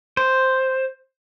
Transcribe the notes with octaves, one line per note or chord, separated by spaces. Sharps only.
C5